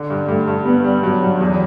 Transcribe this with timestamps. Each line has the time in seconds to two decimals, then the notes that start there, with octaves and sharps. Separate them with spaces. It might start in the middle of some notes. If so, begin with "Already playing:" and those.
Already playing: D3
0.10 G2
0.28 G2 A3
0.48 G2
0.66 G3 B3
0.84 G3
1.03 G2 F#3
1.22 G2
1.41 E2